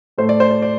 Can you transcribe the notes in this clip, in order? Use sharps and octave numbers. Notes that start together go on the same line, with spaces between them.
A2 A3 C5
D5
C5
D5
D5